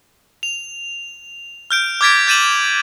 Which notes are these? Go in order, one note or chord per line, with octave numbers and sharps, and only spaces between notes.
F7
F6 G6 D7
D6 F6 G#6 A6 B6 D7
G6 A6 D#7 E7 F#7